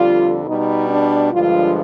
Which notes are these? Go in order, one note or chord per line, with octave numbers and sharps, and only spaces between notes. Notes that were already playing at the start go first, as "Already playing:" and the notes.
Already playing: F2 D3 G3 F4
B2 G3 D#4
D4
G2 D3 F3 G#3 F4